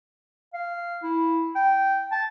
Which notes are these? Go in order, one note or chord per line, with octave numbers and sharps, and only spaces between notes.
F5
E4
G5
A5